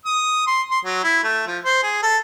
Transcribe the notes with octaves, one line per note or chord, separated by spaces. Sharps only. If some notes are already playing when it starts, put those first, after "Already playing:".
D#6
C6
C6
F#3
E4
A3
F3
C5
G#4
A4